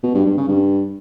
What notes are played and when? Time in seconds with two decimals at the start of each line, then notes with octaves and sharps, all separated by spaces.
0.03 B2
0.15 G2
0.26 G2
0.37 C#3
0.49 G2